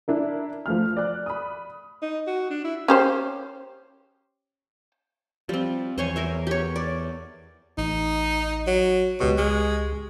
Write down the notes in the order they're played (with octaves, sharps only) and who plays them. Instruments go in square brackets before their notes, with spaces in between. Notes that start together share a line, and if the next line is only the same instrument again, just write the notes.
[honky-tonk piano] D4 E4 A#4
F3 A3 F6
D5 F#6
B5 D#6
[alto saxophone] D#4
F#4
D4
E4
[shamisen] C#4 G4 C5
[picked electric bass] F3 [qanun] G3 C4
[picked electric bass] E2 [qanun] C5 C#5 G#5
[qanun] A#4 C5 E5
G4 C#5
D5
[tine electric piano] A1 [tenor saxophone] D#4
[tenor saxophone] F#3
[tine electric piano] C#2 G4 C#6 [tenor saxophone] B2
[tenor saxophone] G#3